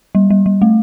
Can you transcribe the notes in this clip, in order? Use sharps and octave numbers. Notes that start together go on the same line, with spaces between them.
G3
G3
G3
A3